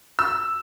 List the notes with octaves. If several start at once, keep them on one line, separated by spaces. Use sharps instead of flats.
E6